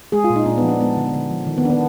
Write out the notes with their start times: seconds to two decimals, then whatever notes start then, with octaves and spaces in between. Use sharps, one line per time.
0.12 G#3 G#4
0.24 F4
0.30 A#2
0.36 D#4
0.46 A#2 D4
0.58 F3 B3
0.69 D4
0.80 G#3 B3
0.97 D3
1.14 D3
1.31 F3
1.47 D#3
1.58 B3
1.64 D#3 D4
1.70 B3